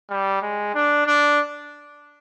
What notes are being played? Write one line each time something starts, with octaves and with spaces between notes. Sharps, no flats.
G3
G#3
D4
D4